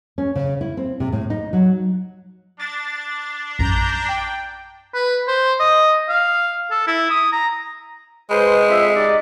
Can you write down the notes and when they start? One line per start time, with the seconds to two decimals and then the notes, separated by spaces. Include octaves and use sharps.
0.18 C#4
0.36 C#3
0.61 E4
0.77 C4
1.00 C3
1.12 A2
1.30 D#4
1.53 F#3
2.60 D4 A6 A#6
3.59 A#1 F#2 A#5 G6
4.08 G5
4.94 B4
5.28 C5
5.60 D#5
6.09 F5
6.71 A4
6.87 E4
7.10 D#6
7.33 A#5
8.30 G#3 B4 C5
8.68 F2 E5
8.95 D#4 G4 D5